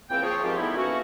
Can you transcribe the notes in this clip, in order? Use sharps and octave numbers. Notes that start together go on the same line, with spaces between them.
C#2 E3 A#3 C4 G5
F3 G#4 C5 C#5
G#2 D#3 F3 C4 F4 G4
G3 A3 B3 D#4 E4
E3 A3 A#3 C#4 F#4